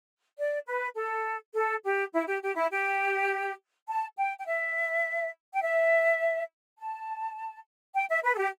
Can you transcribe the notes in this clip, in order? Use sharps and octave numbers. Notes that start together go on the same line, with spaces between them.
D5
B4
A4
A4
G4
E4
G4
G4
E4
G4
A5
G5
G5
E5
G5
E5
A5
G5
E5
B4
A4
G4